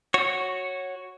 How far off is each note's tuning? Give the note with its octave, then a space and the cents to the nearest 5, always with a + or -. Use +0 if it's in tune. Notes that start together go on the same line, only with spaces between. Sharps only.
F#4 +0 C#5 -10